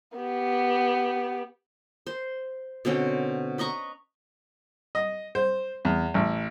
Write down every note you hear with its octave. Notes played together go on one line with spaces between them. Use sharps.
B3 G4
C5
B2 D3 C4 C#4
B4 D#5 A#5 C#6
D#5
C5
E2
A1